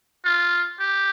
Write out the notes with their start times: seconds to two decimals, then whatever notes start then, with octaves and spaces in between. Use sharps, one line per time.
0.25 F4
0.79 G4